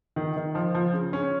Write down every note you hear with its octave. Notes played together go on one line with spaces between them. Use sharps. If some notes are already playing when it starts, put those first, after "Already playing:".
D#3
D#3
F3
F3
C#3
C#4